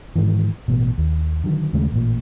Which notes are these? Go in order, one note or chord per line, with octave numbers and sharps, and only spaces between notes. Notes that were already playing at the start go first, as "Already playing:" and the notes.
G#2 D#3 E3
A1 B2
D#2
D3 D#3 F#3
D#2 C#3 G#3 A3
A1 A#2